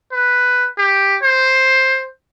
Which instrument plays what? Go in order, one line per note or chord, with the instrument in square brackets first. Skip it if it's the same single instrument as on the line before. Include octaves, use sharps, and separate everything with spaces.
[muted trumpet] B4
G4
C5